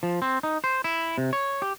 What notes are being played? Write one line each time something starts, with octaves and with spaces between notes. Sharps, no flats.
F3
C4
D#4
C5
E4
C3
C#5
G4